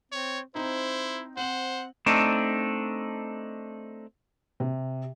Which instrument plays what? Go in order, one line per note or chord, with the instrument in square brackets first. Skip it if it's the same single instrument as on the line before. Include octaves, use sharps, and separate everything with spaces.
[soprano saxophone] C4 [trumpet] C#5
[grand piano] C4 D#4 [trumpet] E4 [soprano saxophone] C5
[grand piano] C4 F#7 [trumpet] C5 [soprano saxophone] F#5
[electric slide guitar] A3 C4 D4 D#4
[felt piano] C3